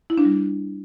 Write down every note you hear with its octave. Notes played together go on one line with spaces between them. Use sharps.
E4
D4
G3